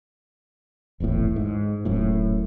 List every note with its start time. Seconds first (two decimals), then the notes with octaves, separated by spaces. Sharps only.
1.00 D#1 G#1 E2 A2
1.36 G#2
1.85 D#1 F#2 A2